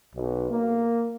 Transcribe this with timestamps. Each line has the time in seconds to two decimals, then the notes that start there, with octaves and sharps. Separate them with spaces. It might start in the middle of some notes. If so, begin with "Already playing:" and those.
0.15 B1
0.51 A#3